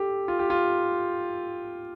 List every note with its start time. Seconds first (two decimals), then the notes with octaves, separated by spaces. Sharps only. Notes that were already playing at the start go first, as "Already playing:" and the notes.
Already playing: G4 A4
0.28 F4
0.39 G4
0.50 F4